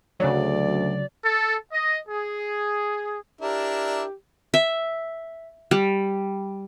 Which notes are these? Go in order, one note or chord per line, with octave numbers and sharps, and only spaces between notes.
D2 C#3 F#3 D5
A4
D#5
G#4
D4 E4 G4 A#4
E5
G3